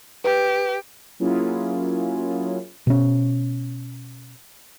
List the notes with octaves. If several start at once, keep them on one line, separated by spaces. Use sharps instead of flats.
G4 B4
F#3 A#3 C#4 E4 F4 G#4
B2 C#4